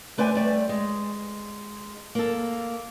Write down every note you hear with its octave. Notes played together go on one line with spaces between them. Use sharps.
A3 B4 C5 D5 G#5
G3 A3 D5
G#3
A#3 A4